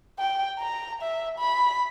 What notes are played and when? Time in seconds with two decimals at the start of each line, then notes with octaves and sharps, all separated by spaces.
0.19 G5
0.59 A#5
1.02 E5
1.39 B5